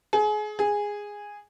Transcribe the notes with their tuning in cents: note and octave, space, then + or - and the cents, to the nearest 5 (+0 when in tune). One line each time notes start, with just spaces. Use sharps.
G#4 +30
G#4 -10